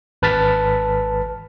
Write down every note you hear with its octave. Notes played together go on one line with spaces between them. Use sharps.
G#1 B4 A5 F6 A6 B6